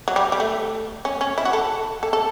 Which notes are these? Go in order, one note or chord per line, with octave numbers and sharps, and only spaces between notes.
F#3
G3
G3
A3
C#4
C#4
E4
F#4
A4
A4
A4